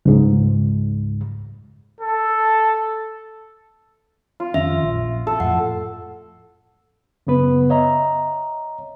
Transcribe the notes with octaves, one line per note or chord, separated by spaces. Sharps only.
C#2 G#2
A4
F4
F2 D#3 C#4 E5
A#1
A4
F2 A2 F#5
F#2 C#3 B3 B4
C#5 D#5 E5 A#5